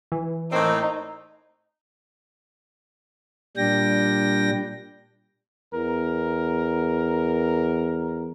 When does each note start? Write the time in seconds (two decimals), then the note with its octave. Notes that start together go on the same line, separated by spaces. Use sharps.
0.12 E3
0.52 A2 A#3 C4 D#4
3.57 A#2 G3 D4 G5 A#6
5.74 E2 A#4